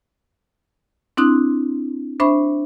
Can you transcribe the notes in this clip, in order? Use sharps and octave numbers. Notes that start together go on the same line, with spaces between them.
C4 D4 E4 C6 D#6 F#6
D4 C5 E5 B5 C#6